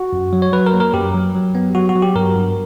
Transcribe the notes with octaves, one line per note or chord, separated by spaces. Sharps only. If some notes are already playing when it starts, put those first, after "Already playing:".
Already playing: F#4
F#2
F#3
C#5
F#3 B4
A#4
A#3
A#4
F#2 G4
F#3
F#3
B3
F#3 F#4
F#4
F#3
G4
G2 A#4
G2